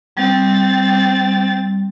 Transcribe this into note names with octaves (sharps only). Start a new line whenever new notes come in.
G3 C4 A6